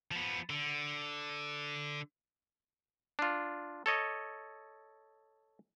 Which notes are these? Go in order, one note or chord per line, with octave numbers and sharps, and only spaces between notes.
F3 B3
D3
D4 F4
A4 C#5 D#5